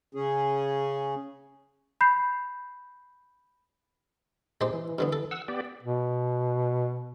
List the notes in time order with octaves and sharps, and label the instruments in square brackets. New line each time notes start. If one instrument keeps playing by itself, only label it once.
[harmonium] C#3 C#4 G#4
[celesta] B5 G6 C7
[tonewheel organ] A#2 D#4 [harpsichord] G#3 G4 C5
[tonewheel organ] E3
[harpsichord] G2 D3 B3
A4
[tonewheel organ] F#5 E6
B3 G4 D5
[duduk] B2